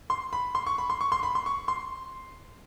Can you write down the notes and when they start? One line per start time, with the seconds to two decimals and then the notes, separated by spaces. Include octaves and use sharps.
0.10 C6
0.33 B5
0.55 C6
0.66 C#6
0.78 B5
0.90 C6
1.01 C#6
1.12 C6
1.23 B5
1.35 C6
1.46 C#6
1.68 C6